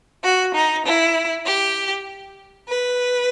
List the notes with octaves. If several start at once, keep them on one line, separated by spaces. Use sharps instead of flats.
F#4
D#4
E4
G4
B4